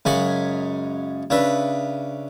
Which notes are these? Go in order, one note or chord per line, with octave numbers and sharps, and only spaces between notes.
F#2 C#3 G#3 G#5 B5 C#6
C#3 D4 B4 E5